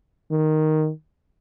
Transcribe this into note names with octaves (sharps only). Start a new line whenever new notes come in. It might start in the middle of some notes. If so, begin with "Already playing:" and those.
D#3